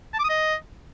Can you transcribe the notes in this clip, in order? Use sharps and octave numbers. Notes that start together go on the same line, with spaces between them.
A5
D6
D#6
D#5